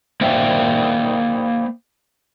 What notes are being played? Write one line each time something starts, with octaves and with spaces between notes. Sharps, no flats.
A#3 C5 D5 E5 G5